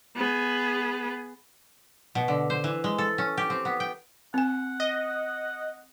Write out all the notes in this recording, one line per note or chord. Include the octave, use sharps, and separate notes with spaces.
B3 G#4
B2
D3
C5
E3
G#3
A4
C#4
G4
C4
B3
G5
C4 F#5 G#5
D#5